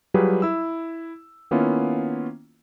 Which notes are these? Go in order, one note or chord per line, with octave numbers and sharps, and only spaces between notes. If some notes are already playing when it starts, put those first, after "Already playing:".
F#3 G3 F4 G4 G#4 B4
E4 E6
D#3 A#3 B3 C#4 E4 F4